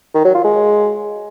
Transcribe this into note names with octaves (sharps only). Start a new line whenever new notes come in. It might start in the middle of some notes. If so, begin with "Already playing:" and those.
D#3
F#3
F4
G#3